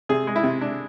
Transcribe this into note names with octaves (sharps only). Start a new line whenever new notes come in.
C3 G#4
G#3
E4
C3
D4